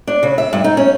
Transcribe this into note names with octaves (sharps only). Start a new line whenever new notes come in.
D4
C#3
E5
G2
D#4
C#4